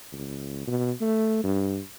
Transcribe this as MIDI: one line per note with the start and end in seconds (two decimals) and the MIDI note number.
0.13 0.63 37
0.67 0.91 47
1.01 1.40 57
1.44 1.79 43